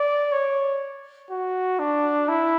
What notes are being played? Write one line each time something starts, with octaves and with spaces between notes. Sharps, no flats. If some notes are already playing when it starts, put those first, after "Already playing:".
Already playing: D5
C#5
F#4
D4
E4